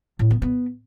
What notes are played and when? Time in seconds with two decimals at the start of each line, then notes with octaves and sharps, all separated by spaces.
0.19 A2
0.31 B3
0.42 B3